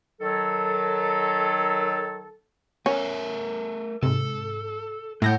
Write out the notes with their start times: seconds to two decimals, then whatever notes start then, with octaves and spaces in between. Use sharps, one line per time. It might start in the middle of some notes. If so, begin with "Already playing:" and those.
0.21 D#3 F#3 A4
2.86 A3 C#4 A#4 E5
4.03 G#2 C3 A4
5.22 A2 G#3 F#5 G6 A#6 D7